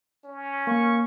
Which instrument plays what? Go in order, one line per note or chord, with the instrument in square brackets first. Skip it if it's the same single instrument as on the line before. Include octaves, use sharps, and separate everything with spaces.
[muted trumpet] C#4
[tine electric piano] A#3 [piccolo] C#6